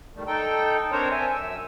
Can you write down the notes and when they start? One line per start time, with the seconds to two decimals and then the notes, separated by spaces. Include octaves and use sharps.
0.15 D#3 G3 A3
0.27 D#4 A4 G5
0.92 C4 D4 A#4 C5 C#5
1.11 E5 G#5
1.34 F#2 E6